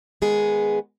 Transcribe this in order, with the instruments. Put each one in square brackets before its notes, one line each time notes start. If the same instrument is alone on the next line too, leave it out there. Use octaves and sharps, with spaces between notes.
[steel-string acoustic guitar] D#3 G#3 B3 G#4